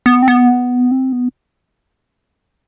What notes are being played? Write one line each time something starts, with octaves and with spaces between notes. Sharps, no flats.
B3
C4
B3
C4
B3